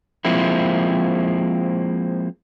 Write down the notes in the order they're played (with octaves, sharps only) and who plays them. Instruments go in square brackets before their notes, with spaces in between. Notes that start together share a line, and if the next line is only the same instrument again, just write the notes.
[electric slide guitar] F3 G#3 A#3 C4 E4